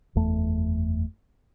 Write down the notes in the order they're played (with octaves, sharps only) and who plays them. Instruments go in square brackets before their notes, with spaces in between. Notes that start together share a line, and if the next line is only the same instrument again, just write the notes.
[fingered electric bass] F#1 E2 A3